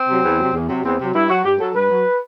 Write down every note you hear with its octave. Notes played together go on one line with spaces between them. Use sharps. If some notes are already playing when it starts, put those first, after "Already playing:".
Already playing: C4
C3 F#3
E2
C3 F#3
E2
C3 F#3
E2 C4
C3 F#3
G2 E4
F#3 F#4
G2 G4
F#3 A4
G2 B4
F#3